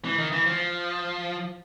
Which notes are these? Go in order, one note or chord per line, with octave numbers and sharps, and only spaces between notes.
E3
D#3
E3
F3